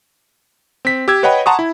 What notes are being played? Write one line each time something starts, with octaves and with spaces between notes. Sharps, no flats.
C4 B6
G4 E6 G#6
B4 C#5 D#5 F#5 G5 B5
F#5 A5 A#5 C6 C#6 D#6
E4